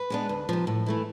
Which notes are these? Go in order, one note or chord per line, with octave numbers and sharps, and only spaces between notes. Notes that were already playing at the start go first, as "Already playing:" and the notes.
Already playing: B4
G#3 B3 D4
D2
C3 F3
A2
E3 A3 E4